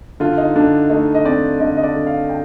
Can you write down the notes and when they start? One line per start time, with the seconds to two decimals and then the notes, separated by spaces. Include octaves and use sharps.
0.20 D3 F4
0.37 D#4
0.56 D3 D4
0.90 A3 D#4
1.15 D#5
1.25 C4 D5
1.60 D3 D#5
1.77 D#5
1.83 D5
1.95 D3
2.07 F5
2.29 G5